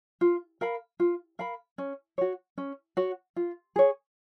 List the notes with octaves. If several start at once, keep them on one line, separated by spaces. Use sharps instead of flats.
F4
A#4 F5 B5
F4
A#4 F5 B5
C#4
F#4 C#5
C#4
F#4 C#5
F4
G#4 C#5